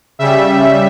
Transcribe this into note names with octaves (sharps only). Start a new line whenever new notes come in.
C#3 G3 E5